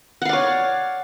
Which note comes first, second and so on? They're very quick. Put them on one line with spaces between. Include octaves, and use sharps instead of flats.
F#5 F5 D5 C#5